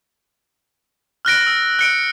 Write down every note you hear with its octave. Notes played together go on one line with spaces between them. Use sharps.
F6 F#6 A#6 D7
E6
F#6 C#7 D7